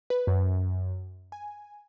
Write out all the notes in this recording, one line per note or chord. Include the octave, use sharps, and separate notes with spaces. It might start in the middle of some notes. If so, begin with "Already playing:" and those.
B4
F#2
G#5